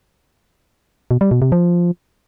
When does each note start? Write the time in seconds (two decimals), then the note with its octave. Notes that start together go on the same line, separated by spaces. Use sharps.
1.11 B2
1.21 G3
1.31 B2
1.42 C3
1.52 F3